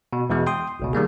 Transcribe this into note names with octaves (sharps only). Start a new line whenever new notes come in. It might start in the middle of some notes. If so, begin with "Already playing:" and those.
B2
E2 B2 E3 G#3 B3
G5 C6 D#6
G#1 C#2 B2
D#3 G3 A#3 G#4